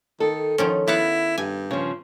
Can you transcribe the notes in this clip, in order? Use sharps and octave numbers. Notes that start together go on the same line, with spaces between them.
D#3 A4
D3 D#3 F3 C#4
B3 E4 F5 F#5
G2 G#5
C#3 F3